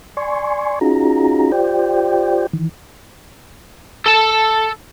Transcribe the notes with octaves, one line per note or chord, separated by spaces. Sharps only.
D5 G#5 C6 C#6
C#4 D#4 F4 F#4 G#4 A#5
F4 G4 C5 D5 G5
D#3 E3
A4 A5